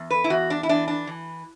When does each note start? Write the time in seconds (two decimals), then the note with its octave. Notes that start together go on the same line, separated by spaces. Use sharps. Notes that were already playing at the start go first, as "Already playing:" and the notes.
Already playing: E2
0.11 B4
0.24 E4
0.30 E2 F#4
0.50 D4
0.63 E4
0.69 E3 D4
0.88 D4
1.07 E3